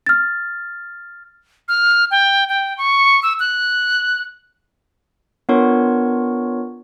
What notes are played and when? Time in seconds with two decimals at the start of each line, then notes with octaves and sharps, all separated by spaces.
0.06 F6 A6
1.68 F6
2.11 G5
2.48 G5
2.78 C#6
3.23 E6
3.40 F#6
5.49 B3 D4 F4 A#4 C#5 C#6